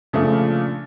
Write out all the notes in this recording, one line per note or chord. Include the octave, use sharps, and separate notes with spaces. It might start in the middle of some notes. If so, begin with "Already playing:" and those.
A#2 C#3 F3 A3 D4